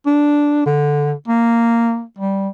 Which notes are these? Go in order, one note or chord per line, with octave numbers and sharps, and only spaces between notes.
D4
D3
A#3
G3